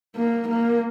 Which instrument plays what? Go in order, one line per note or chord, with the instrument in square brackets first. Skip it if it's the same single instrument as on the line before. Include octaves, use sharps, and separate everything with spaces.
[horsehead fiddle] A#3
A#3